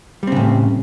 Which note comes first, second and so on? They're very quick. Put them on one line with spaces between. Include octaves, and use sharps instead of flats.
G3 C4 C#3 A2